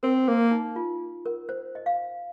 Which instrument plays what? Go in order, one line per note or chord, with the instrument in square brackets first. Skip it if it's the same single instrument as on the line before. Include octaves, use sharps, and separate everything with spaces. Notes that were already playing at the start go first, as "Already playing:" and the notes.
[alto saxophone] C4 [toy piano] A#4
[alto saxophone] A#3 [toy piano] A#4
[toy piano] D#4
F4
A#4
C5
D#5
F5